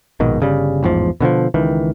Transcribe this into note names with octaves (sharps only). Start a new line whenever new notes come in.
A#1 G#2 B2 D#3
G1 C#3 G3
A1 E2 G#2 F3
B2 D3 E3 F3
C#2 D#3 E3